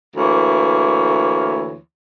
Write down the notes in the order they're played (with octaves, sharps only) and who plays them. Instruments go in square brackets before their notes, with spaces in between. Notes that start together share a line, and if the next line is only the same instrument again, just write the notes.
[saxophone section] D2 E3 A#3 C#5